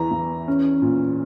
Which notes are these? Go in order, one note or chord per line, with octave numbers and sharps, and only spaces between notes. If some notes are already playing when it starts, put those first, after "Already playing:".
Already playing: E2 E3 A#5
E2
C#4
A#2